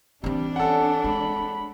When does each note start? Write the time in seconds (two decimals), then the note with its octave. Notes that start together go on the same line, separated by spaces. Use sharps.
0.24 E3 G3 C4 D4
0.56 C#4 A4 F#5
1.04 G#3 B5